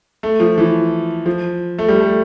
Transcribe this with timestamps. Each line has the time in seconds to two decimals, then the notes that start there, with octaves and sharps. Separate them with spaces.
0.23 A3
0.40 F3
0.58 E3
1.26 F3
1.78 A3
1.88 G3
2.00 A3